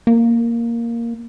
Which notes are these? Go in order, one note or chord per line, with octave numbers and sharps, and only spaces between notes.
A#3